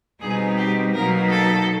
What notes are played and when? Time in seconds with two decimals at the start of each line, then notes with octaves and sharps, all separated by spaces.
0.22 B2 G3 C4 D#4 G#4
0.58 G4
0.94 B2 F#3 A#3 D#4 A#4
1.30 A4